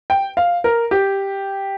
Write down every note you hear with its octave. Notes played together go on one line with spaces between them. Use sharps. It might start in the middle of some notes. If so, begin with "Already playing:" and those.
G5
F5
A#4
G4